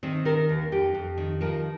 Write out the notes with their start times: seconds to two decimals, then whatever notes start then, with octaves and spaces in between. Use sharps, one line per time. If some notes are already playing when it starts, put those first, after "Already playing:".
0.03 D#3 C4
0.25 D#3 A#4
0.49 D#2
0.72 F2 G4
0.94 F2
1.17 D#3
1.41 F3 A#4